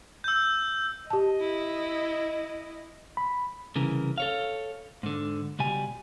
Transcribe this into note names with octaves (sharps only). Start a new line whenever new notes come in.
E6 G6
G4 D#5 A5
E4
B5
C2 C#3 E3 A#4
A4 C#5 F5
G#2 D3
C#2 B2 G3 G#5